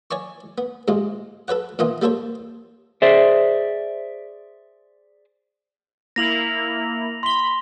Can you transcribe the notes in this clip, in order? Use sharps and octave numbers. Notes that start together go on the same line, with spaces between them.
C#5 D5 G#5 C#6
B3
G#2 C3 G#3 F4
A4 B4 C#5 F#5
A#2 E3 B3 D#4 F4 D#5
G3 A#3 A4 C5 C#5
G#4 C5 D5 E5
A#3 E4 A#6 F7 F#7
B5 C6 G7